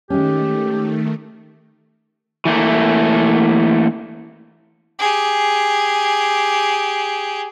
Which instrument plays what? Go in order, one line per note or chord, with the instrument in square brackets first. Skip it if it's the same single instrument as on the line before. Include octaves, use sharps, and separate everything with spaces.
[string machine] D#3 A3 [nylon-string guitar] G#3 C#4 [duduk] G4
[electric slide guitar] E3 A3 A#3
[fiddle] G4 G#4